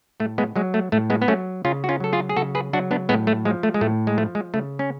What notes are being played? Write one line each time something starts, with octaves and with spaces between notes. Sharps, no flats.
A2 A3
G#3 B3
F#3 G#3
A3
A2 A3
G#3 B3
B3
F#3 A3 C#4
C#3 C#4 F4
F#4
C#4 F4
F#3 A4
F4 G#4
G#4
C#3 F#4 A4
G#4 B4
F#3 D4 F#4
B3 D4
A2 G#3 B3
A3
F3 G#3
A3
G#3
A2 A3
G#3
F3 A3
G#3
C#3 A3
C#4